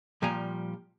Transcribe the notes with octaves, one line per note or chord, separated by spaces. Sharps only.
A#2 F3 G3 G#5 A#5